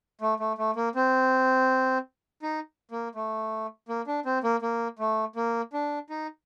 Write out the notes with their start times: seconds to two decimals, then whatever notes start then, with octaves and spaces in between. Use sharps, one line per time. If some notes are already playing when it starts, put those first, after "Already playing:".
0.21 A3
0.40 A3
0.58 A3
0.76 A#3
0.95 C4
2.42 D#4
2.91 A#3
3.15 A3
3.89 A#3
4.07 D4
4.26 C4
4.44 A#3
4.62 A#3
4.99 A3
5.36 A#3
5.73 D4
6.10 D#4